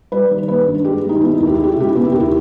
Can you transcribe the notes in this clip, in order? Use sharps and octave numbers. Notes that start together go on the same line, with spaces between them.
G3 B4
D#3
A#3 B4
G2
G#3 G4
D#3
D#4
B3 E4
D#2 E4
G4
E4
G#3
G4
E4
C#3 G4
E4
B3 G4
E4
D#2 G4
E4